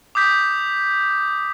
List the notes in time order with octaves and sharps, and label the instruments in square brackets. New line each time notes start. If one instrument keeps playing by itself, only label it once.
[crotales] D6 D#6 G6 B6